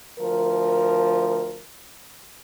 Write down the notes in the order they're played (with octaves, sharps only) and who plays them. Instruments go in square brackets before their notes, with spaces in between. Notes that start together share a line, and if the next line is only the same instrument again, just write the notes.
[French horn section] D2 F3 A#4